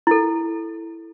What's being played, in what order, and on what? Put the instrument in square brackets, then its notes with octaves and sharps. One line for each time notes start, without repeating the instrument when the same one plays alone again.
[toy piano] E4 A4